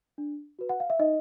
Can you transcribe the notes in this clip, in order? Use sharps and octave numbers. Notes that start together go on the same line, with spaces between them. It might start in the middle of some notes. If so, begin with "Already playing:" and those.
D4
F#4 B4
F#5
F5
E5
D#4 D#5